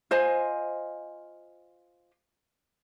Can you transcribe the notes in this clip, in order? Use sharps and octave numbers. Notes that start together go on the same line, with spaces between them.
F4 C5 D#5 G#5